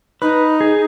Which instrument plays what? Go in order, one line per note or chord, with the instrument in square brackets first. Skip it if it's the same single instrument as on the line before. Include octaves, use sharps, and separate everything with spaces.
[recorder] D#4 [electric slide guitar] B4
[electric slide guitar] G#4